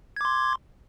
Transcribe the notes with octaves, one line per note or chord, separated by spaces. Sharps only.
C6 D6 G#6